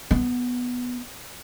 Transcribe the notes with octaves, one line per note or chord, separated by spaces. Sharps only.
B3